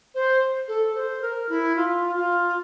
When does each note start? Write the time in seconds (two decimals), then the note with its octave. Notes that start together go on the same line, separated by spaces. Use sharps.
0.15 C5
0.68 A4
0.95 C5
1.22 A#4
1.49 E4
1.76 F4
2.16 F4